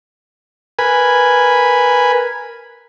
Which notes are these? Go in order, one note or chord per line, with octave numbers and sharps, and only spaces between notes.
A#4 B4 G#5 B5